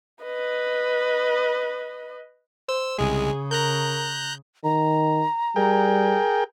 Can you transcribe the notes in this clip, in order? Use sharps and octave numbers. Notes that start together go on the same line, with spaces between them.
B4 D#5
C5 E6
C2 C#3 G#3 G#4
A#4 A#5 F#6 G6
D#3 A#5
G3 G#4 A#4 G5